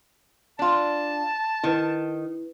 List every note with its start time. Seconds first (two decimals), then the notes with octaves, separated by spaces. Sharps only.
0.59 D4 F4 A5
1.64 D#3 E4 B4